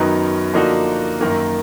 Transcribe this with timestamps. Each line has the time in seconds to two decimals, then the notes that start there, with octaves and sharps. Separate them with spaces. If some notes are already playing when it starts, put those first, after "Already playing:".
Already playing: F#2 D#3 F#3 B3 D#4
0.53 D3 F3 A#3 D#4 F#4
1.21 F#2 D#3 A#3